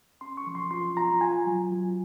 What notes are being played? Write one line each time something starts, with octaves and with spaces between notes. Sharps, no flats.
C#4 C6
C#6
F3
C6
F4 C6
F4 A#5
F4 G#5
F#3
F#3